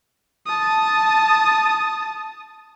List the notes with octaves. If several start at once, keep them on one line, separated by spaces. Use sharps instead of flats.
A5 D#6